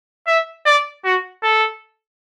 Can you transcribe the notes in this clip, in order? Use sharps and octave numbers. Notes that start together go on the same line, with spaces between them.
E5
D5
F#4
A4